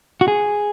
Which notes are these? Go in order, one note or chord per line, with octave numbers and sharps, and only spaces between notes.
F#4
G#4